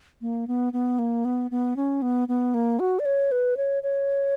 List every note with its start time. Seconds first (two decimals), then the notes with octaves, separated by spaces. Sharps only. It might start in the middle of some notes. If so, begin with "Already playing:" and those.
0.21 A#3
0.48 B3
0.73 B3
0.99 A#3
1.25 B3
1.51 B3
1.76 C#4
2.02 B3
2.28 B3
2.54 A#3
2.79 F#4
2.99 D5
3.05 C#5
3.32 B4
3.57 C#5
3.83 C#5